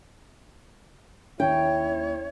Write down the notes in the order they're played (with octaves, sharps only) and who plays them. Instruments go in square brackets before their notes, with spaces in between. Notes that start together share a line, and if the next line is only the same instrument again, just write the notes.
[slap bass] D#2 D#3 C#4 [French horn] E4 [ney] C#5 [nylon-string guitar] G5